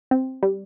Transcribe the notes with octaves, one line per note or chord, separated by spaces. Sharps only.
C4
G3